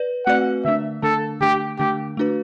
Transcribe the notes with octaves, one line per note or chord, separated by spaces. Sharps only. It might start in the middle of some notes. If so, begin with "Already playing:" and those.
Already playing: B4 D5
A3 C4 F#4 B4 D5 F#5
D3 A3 D4 E5
D3 A3 D4 A4
D3 A3 D4 G4
D3 A3 D4 G4
A3 D4 F#4 B4